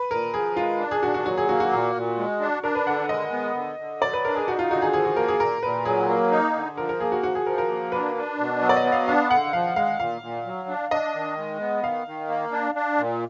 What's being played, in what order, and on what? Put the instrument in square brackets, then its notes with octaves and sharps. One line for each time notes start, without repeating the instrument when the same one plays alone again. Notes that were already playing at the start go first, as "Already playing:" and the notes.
Already playing: [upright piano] B4
[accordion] A#2 [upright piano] A#4
[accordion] F3 [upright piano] G#4
[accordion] G#3 [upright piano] F4
[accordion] D4
[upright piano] G#4
[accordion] A#2 [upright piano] F#4
[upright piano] F#4
[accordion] F#3 [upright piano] F#4
[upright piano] G#4
[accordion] A#3 [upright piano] F#4
[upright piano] F#4
[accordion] A#2
A#2
G#3
D4
[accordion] D4 [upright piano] A#4
[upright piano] B4
[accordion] D3 [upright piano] F#5
[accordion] G#3 [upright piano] D#5
[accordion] B3
D3
D3
[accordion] F#3 [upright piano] D5
[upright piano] B4
[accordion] D4 [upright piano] A#4
[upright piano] G#4
[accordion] D#4 [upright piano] F#4
[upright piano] F4
[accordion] D3 [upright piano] F#4
[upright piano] G#4
[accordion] F3 [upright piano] G#4
[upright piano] F#4
[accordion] A#3 [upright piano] A#4
[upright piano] G#4
[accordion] A#2 [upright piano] A#4
[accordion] A#2 [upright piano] B4
[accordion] F#3 [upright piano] G#4
[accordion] A#3
D#4
D3
[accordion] F3 [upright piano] A#4
[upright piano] A#4
[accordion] A#3 [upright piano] G#4
[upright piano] F#4
[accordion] F3 [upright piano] F#4
[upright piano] G#4
[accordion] F3 [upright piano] A#4
[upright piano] A#4
[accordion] A#3
[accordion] D4 [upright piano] B4
[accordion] D4
B2
F#3
[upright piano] D5
D#5
[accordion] B3
[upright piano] F5
[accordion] D4 [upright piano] F5
[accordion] D3 [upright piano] F#5
[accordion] F3 [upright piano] F5
[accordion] G#3 [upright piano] F5
[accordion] A#2 [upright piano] F5
[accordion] A#2
F#3
D4
[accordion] D4 [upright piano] D#5
[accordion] D#3
G#3
B3
[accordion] D#3 [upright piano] F5
[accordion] D#3
A#3
D4
D4
A#2